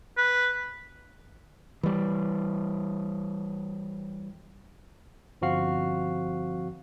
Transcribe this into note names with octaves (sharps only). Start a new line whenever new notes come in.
B4
E3 G3
G1 F3 C4 F#4 F5 C7